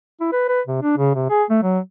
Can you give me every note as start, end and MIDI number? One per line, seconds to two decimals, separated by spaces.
0.21 0.28 64
0.32 0.48 71
0.49 0.61 71
0.67 0.80 48
0.82 0.95 62
0.98 1.12 49
1.15 1.26 48
1.30 1.44 68
1.50 1.59 57
1.63 1.79 54